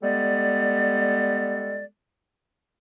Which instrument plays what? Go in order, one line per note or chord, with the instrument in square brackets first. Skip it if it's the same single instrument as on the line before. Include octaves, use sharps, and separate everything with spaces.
[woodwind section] G3 G#3 B3 A4 D5